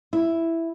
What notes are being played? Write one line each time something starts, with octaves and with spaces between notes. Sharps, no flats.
E4